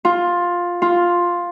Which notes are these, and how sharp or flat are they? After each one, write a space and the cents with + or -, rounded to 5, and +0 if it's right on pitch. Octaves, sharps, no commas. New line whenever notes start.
F4 +10
F4 +5